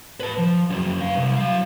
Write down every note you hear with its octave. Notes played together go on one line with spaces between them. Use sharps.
B4 A5
F3
F#2 C#3
B4 F5
C2
F#3 F5